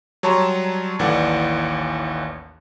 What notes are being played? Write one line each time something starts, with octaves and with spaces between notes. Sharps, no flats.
F#3 G3 C#5 A5 A#5 C6
A1 D#2 E3 A4 D5 F#5